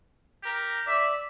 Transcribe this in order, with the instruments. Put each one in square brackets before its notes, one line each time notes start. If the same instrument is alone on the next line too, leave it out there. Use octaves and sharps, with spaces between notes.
[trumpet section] G4 A#4
[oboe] D5 [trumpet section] E5